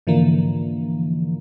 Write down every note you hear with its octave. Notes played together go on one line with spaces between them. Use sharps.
G#2 D3 E3 F3 A#3